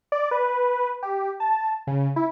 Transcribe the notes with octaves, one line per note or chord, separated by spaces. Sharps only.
D5
B4
G4
A5
C#3
E4